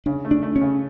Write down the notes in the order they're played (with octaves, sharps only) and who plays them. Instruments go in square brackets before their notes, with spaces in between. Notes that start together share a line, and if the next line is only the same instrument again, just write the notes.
[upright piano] C#3 [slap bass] D4
[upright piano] A3
[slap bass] D4
[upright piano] A3
[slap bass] C#4
[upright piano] C#3